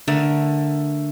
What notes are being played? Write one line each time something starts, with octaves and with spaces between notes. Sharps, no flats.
D3 A3 A#4